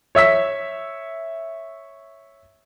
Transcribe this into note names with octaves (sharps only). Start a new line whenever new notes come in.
C#5 E5 E6 B6